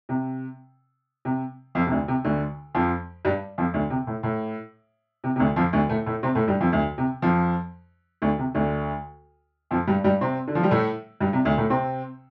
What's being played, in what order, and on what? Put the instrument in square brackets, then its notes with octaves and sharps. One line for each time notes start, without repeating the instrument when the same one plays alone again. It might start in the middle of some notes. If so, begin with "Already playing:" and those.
[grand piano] C3
C3
F2 F3
C3
D2 D3
C3
D2 D3
F2 F3
G2 G3
F2 F3
D2 D3
C3
A2
A2
C3
C3
D2 D3
F2 F3
D2 D3
A2 A3
A2 A3
C3 C4
A2 A3
G2 G3
F2 F3
D2 D3
C3
F2 F3
D2 D3
C3
D2 D3
F2 F3
G2 G3
G2 G3
C3 C4
D3
F3
G3
A2 A3
G2 G3
C3
D2 D3
A2 A3
C3 C4